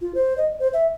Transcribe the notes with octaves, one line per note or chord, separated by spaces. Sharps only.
F4
C5
D#5
C5
E5